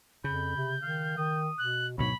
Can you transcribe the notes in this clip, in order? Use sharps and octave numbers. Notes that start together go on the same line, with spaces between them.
F2 C#3 B5 G6
C3
D#3 F5
D#3 D#6
B2 F#6
D2 G#2 B2 F#3 C#5 B5